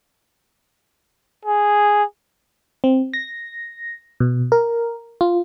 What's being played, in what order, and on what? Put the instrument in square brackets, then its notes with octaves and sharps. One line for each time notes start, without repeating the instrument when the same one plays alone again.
[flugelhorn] G#4
[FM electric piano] C4
A#6
B2
A#4
F4